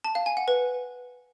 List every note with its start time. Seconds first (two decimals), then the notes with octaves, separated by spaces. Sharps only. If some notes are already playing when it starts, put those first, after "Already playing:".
0.04 A5
0.15 F5
0.26 G#5
0.37 F#5
0.48 B4